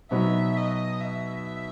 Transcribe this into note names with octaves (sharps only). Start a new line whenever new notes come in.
B2 F#3 B3 D#4 E5
D#5
E5